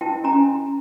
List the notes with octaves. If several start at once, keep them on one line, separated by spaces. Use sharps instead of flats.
E4 G5 A5
C#4 G#5 A#5